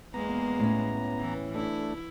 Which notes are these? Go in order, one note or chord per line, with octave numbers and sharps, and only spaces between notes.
E2 G#3 A#3 B3 A#5
A2 C#4
E3
A3 D4 E4